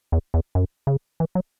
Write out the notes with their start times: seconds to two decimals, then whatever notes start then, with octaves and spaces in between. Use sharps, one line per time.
0.12 E2
0.34 E2
0.55 F#2
0.87 C#3
1.20 E3
1.35 F#3